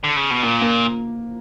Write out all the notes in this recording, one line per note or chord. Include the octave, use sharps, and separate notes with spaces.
D3
C#3
B2
A#2 A#3
A#3